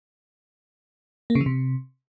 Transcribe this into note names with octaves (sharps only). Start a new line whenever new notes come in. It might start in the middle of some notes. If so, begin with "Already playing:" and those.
A#3
C#3
E3
C3